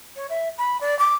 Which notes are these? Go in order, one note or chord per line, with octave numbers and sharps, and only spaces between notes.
C#5
E5
B5
D5
D6